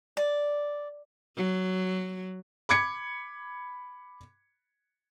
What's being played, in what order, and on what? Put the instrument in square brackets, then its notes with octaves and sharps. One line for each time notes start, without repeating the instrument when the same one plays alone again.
[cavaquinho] D5
[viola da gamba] F#3
[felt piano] B5 D6 G#6 C#7